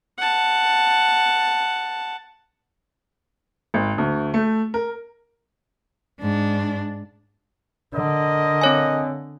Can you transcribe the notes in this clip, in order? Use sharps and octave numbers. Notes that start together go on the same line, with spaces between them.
F#5 A5
G#1
D2
A3
A#4
G#2 D4
D3 A#4 D#5
C4 C#5 G#5